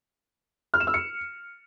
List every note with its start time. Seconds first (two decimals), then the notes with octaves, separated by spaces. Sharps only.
0.74 F6
0.80 E7
0.87 E6
0.94 C#7